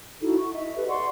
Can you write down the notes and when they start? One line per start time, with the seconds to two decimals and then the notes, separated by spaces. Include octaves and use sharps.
0.21 D#4 E4 F#4 A4
0.36 C#6
0.54 D#5 E5
0.76 G4 A4 B4
0.88 D5 F#5 C6 C#6